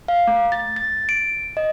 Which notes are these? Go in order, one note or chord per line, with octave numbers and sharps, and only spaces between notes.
F5
A3
A6
A6
D7
D#5